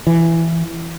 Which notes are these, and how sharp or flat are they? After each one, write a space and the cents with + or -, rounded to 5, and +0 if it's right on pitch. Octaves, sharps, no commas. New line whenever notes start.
E3 +10